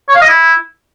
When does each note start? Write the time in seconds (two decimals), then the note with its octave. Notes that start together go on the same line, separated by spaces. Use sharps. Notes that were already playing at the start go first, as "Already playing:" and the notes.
0.09 C#5
0.15 F5
0.22 D#5
0.28 E4